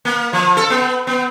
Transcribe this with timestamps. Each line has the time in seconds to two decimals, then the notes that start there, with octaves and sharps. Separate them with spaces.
0.05 A#3
0.33 F3
0.57 A4
0.70 B3
1.07 B3